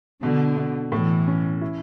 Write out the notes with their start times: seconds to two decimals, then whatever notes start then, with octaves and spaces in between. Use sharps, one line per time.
0.22 B2 D3
0.57 B2
0.92 A2 E3
1.27 C#4
1.61 E4